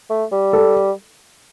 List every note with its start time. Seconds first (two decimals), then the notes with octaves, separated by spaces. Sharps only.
0.10 A3
0.32 G3
0.53 A4